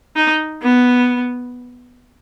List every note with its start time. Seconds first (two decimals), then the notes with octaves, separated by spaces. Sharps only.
0.16 D#4
0.63 B3